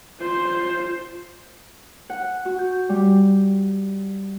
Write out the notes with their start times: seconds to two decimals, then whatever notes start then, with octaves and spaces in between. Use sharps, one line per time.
0.18 F4 C5
2.10 F#5
2.45 F#4
2.59 G6
2.89 G3